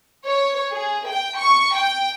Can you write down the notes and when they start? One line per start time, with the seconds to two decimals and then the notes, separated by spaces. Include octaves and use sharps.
0.25 C#5
0.71 G#4
1.08 G5
1.38 C#6
1.75 G5